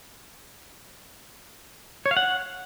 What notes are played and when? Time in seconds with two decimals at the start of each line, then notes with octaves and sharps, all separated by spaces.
2.06 C#5
2.11 F5
2.17 F#5